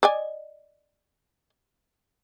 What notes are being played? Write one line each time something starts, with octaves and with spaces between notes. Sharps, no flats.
D5 D#5 G#5